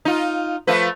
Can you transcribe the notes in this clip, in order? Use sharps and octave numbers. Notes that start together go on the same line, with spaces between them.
D#4 F4
F3 A3 B4